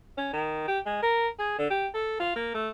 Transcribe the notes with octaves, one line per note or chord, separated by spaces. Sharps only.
C#4
D#3
G4
G#3
A#4
G#4
D3
G4
A4
F4
A#3
A3